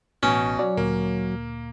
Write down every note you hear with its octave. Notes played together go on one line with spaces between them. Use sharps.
A1 B2 C#4
F#3 D5
D2 A#2 A#3